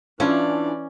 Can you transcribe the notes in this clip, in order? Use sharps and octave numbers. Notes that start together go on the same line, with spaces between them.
E3 C#4 D4 E4 F4 D5